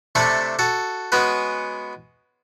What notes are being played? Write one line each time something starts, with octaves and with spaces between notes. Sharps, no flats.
C3 A3 D4 A4 B5 C#6
F#4 A4
G#3 B3 C#4 F#4 B4